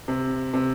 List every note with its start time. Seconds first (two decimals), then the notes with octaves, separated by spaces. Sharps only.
0.08 C3
0.54 C3